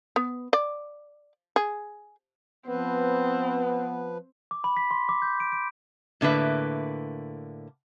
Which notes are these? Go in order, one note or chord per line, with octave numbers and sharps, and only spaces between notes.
B3
D5
G#4
F3 B3 C4 B4
D6
B5
B6
C6
D6
G6
D7
D7
A2 D3 A#3 B4 E5